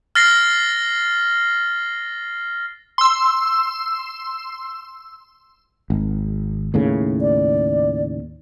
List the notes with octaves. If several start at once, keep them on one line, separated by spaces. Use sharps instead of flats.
F6 A6 A#6 C7 G7
C6 E6
G#1
D#2 A2 C#3
D5